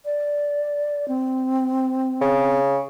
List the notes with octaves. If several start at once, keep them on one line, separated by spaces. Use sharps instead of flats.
D5
C4
C#3